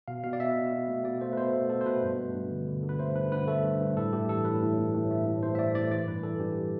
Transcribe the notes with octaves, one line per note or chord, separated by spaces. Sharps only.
B2 F5
B2 F5
D5
B2 E5
B2
B2
A3
B2 D5
A3 C5
B4
B2 C5
A3 A4
B2 A4
C5
B2 B4
G2
A3
G2
D3
D3
D3
B4
A3 C5
G2 B4
D3 B4
A3 A4
G2
G2
A2 A4
A3 G4
E3 A4
A2 B4
A2
A2
A2
A3
A2
A2 C5
E5
A3 D5
A2 D5
E3 D5
G2 B4
E3 A4
G2 G4